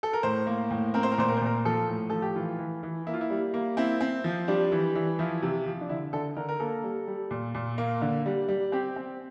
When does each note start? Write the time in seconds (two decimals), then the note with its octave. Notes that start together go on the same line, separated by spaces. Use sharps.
0.03 A4
0.13 A#4
0.23 A2 C5
0.47 A#3
0.71 A2
0.94 C4 A#4
1.03 C5
1.12 A#4
1.18 A#2 C5
1.28 A#4
1.37 C5
1.41 A#2 A#4
1.65 F3 A4
1.88 A2
2.10 F3 A4
2.22 G4
2.36 E3 F4
2.59 E3
2.83 E3
3.07 A#3 E4
3.14 F4
3.21 E4
3.30 G3
3.54 A#3
3.77 C4 E4
4.01 C4
4.24 F3
4.48 G3 D4
4.72 E3
4.95 E3
5.19 F3 E4
5.43 C3
5.66 F3
5.81 D4
5.89 D3 E4
6.13 D3 A4
6.37 D3 A#4
6.49 A#4
6.60 A#3 A4
6.84 G3
7.07 G3
7.31 A#2
7.55 A#2
7.78 A#3
8.02 D3
8.26 G3
8.48 G3
8.72 C4 G4
8.96 C4